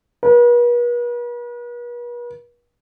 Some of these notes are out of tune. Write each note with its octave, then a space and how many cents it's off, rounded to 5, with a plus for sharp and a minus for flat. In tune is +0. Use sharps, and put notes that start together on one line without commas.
B4 -45